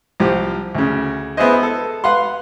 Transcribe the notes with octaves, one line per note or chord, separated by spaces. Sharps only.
C2 F3 G4
D2 C#3
B3 E4 G#4 B4 C5 D#5
A4
B4 F5 F#5 C6